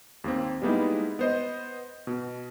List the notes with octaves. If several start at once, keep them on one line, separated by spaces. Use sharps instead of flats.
D#2 A#3 C4
G3 G#3 A#3 B3 D#4 E4
B3 C5 D#5
B2